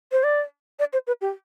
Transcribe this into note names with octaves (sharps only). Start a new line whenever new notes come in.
C5
D5
D5
C5
B4
G4